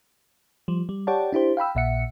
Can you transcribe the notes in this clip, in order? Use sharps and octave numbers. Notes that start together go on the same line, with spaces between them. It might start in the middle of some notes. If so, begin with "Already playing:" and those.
F3 G3
G3
G4 C#5 D5 F#5 G5 A5
D4 E4 G4 C5
F5 G5 B5 E6
A#1 A#2 E5 F#5 C#7